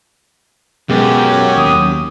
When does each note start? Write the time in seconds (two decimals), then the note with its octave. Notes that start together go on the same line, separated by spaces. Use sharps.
0.90 F#2 B2 G#3 B3 G4
1.21 C#5
1.57 D#2 D#6